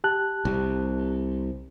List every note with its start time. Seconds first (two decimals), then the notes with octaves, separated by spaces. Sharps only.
0.04 G4 A5 F#6
0.45 C2 C3